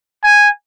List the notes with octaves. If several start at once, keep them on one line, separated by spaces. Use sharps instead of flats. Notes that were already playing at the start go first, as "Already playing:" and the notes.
G#5